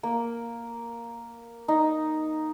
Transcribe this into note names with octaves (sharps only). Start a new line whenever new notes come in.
A#3
D#4